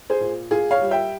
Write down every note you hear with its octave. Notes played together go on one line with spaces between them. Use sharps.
G#4 C5
A#2
A#2 F4 G#4
C#5 F5
G3
E5 G5